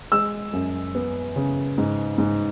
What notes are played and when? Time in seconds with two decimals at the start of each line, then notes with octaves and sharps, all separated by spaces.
0.12 G#3 E6
0.53 F#2
0.95 B3
1.36 C#3
1.78 G#2
2.18 G#2